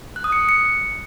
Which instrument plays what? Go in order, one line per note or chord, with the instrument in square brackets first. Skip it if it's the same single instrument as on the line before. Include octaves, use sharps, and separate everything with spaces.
[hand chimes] F#6
D#6
C#7
F#6
C#7